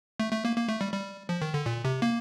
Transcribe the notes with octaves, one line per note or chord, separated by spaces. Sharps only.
A3
A3
A#3
A#3
A3
G3
G3
F3
D#3
D3
A#2
C3
A#3